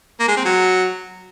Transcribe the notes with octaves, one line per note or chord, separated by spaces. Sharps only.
A#3
G#3
C4
F#3